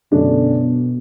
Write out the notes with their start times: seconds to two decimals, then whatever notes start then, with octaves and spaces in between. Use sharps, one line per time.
0.12 F#2 B2 D3 A3 D4